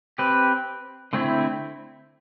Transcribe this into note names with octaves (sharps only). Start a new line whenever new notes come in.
C4 G4 B4
D3 A3 C4 E4